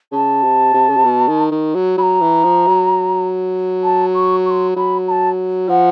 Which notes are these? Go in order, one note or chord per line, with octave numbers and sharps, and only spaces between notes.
C#3 A5
C3
C3
C#3
C3
B2
D#3
D#3
F#3
F#3 A#5 B5
E3
F3
F#3
A5
C#6
C#6
C6
F#3 B5
A#5
A5
F3 F#5